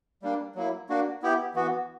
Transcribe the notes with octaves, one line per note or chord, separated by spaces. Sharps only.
G3 A#3 D4
F#3 A#3 E4
A#3 D4 F#4
B3 E4 G4
E3 B3 F#4